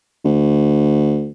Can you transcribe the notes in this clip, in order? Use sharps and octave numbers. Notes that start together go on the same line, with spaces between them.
D2